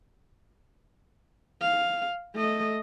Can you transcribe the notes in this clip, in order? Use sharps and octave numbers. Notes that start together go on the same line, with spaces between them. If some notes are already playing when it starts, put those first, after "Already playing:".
F5
A3 D#5